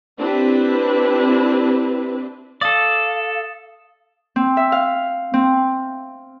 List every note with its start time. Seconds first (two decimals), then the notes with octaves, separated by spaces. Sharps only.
0.18 C4 D4 E4 G4 B4
2.61 A4 D5 F5 D#6 A6
4.36 C4
4.57 E5
4.72 F5
5.34 C4